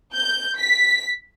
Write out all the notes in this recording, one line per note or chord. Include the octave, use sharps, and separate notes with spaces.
G6
B6